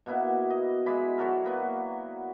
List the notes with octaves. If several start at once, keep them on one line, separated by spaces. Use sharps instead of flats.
B2 A#3 B3 E4
D#5
G#3 E4 D5 B5
F#3 F#4 A4 A#4
A#3 B3 B4